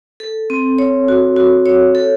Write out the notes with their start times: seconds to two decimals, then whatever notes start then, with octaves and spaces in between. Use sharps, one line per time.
0.20 A4
0.50 C4
0.79 C#5
1.08 F#4
1.36 F#4
1.66 C#5
1.95 A4